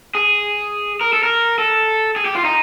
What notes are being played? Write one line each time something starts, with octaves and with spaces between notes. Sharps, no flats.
G#4
A#4
A4
A#4
A4
G#4
G4
F4
D#4